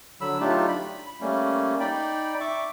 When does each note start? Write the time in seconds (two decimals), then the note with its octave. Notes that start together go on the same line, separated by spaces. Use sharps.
0.21 D3 F#3 B5 E6
0.40 F#3 A3 D4 D#4 F4 G4
0.68 B5
1.21 G3 A3 A#3 C#4
1.80 D#4 D5 G5 B5
2.40 E5 C#6 D6